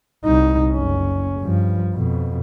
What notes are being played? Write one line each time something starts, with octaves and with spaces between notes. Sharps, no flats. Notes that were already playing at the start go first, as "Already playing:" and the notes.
C2 D#4
F#1 C#4
G2 F3
F2 B2